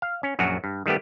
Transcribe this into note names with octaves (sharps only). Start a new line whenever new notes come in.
F5
C#4
A#1 F#2 F#3 F#4 A#5
G2
D#3 G3 A3 B3 G4